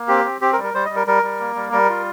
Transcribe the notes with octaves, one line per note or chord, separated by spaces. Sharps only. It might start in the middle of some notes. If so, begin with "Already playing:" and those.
Already playing: A#3
C4 G4
C4
C4 G4
A#4
G3
A#4
G3 C5
G3 D#5
A#4
G3 A#4
G3
A#3
G3
G3 A#4
F4